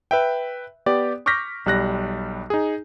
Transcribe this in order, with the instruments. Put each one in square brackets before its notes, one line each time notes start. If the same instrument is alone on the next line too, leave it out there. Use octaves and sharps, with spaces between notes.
[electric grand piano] B4 E5 G5
B3 G4 D5
C#6 D6 F6 G6 A#6 B6
B1 G3 F#6 A#6
D#4 G#4